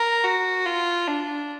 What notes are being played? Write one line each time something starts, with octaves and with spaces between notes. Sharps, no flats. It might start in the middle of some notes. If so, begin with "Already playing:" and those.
Already playing: A#4
F#4
F4
D4